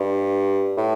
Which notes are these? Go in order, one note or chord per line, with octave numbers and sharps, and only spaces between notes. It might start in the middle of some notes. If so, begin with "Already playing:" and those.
Already playing: G2
A2